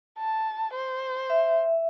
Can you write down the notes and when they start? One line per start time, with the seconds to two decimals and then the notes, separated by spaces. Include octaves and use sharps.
0.19 A5
0.74 C5
1.30 E5